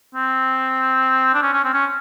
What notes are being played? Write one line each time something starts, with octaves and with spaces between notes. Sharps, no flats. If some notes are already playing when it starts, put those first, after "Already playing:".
C4
D4
C#4
C#4
C4
C#4